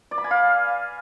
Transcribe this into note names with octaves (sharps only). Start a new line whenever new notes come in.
D5
B5
G#5
F5